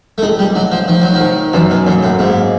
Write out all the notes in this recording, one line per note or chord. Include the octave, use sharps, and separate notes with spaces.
A3
F1 G#3
G3
F1 F#3
F3
D#3 F3
F#3
F3
D#3
F#2 E3
B2
A#2 F#3
A2
G#2 A#3